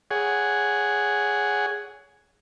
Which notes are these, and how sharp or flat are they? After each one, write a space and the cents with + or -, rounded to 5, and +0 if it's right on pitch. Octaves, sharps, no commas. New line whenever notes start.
G#4 +0 C#5 +20 F#5 +0